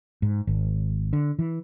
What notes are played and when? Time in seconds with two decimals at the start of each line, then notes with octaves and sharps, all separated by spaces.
0.22 G#2
0.47 G#1
1.13 D3
1.39 E3